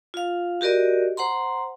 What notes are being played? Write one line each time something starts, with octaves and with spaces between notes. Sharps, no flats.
F4 F5
F#4 G4 A#4 D5 D#5
C5 F#5 A#5 C6